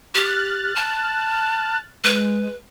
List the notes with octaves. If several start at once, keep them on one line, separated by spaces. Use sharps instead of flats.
G4 F6 F#6 A6
A5
G#3 B4